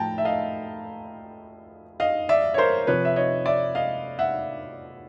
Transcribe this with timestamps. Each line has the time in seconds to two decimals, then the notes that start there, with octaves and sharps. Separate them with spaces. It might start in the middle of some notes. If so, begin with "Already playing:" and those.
Already playing: A2 F3 G5 A5 A#5
0.18 E5
0.25 D#5 F5
2.00 D#5 F5
2.29 D5 E5
2.54 C#5
2.58 A#4 C5
2.87 C3 F3 B4 C#5
3.05 E5
3.16 C#5 D#5
3.46 D5 E5
3.75 D#5 F5
4.19 E5 F#5